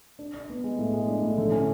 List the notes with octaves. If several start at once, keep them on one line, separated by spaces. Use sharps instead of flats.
D4
D4
B3
G#3
A2
G#3
D4
A2
D3
C#4